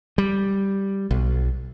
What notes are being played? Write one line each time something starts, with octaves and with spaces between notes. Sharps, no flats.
G3
B1